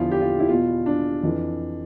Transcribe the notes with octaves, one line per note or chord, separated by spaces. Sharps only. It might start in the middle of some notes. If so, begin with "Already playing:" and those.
Already playing: E2 D3 F3 E4 F4
G4
F4
E4
E2 F4
B2
D4
F2 E3